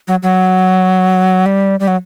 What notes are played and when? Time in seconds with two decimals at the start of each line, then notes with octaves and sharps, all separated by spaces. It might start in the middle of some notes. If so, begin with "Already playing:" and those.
0.08 F#3
0.23 F#3
1.46 G3
1.80 G3
1.87 F#3